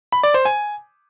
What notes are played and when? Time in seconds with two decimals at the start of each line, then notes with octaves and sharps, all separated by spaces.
0.12 B5
0.23 D5
0.34 C5
0.45 G#5